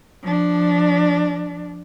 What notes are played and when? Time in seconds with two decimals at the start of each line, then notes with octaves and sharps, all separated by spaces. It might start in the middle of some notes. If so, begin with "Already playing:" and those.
0.22 F3 D4